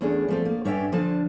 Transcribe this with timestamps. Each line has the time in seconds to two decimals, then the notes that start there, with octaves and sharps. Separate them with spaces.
0.01 E2 A3 C#4 D4 G#4
0.28 F3 A3 C4
0.45 A#3
0.65 G2 C#4 D4 C#5 E5 G5
0.92 D3 F3 D4 A5